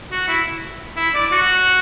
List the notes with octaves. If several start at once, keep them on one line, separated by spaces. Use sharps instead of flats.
F#4
E4
E4
D5
F#4